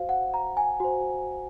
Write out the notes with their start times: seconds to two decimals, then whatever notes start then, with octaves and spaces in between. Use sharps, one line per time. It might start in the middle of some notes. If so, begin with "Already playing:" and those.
Already playing: F#4 C5 F5
0.09 F#5
0.34 A#5
0.57 G#5
0.80 F#4 C5